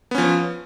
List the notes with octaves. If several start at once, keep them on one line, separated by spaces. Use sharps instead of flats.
F3 B3 C#4